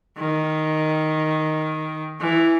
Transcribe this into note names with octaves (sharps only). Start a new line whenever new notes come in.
D#3
E3